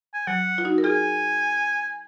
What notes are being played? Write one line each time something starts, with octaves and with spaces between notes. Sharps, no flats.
G#5
F#3 F#5
F4
D#4 F#4
A#4
F4 G#4 G#5